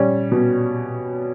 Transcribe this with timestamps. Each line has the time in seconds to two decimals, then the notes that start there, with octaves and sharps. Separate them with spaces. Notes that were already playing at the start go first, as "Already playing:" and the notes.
Already playing: A#2 G3 C#4
0.32 B2